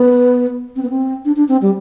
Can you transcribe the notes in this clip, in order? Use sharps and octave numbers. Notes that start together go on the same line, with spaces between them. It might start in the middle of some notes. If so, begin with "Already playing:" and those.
Already playing: B3
C4
B3
C4
D4
D4
C4
G3